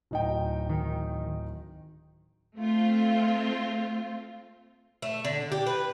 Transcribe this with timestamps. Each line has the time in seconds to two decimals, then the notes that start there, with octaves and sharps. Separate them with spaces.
0.11 D1 D#4 G5
0.69 D#3
2.57 A3 C4 F4
5.02 A3
5.25 D3
5.52 G4
5.67 B4